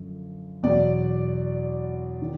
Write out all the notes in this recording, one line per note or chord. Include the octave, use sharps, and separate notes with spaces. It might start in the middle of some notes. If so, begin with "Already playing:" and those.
Already playing: F#2 D3 F3
E2 B2 F#3 D5
D#3